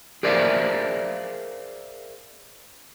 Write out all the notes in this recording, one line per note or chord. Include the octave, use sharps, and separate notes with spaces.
G#4 A#4 C5 D5 E5 F5